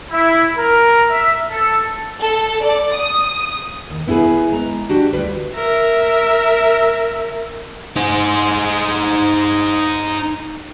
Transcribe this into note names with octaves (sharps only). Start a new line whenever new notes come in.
E4
A#4
E5
A4
A4
D5
D#6
D#2
B3 E4 F4 G#4 B4
G#3 A#5
D4 F#4 G4
D2 G3 F4 B4
A#4 E5
D#4 C5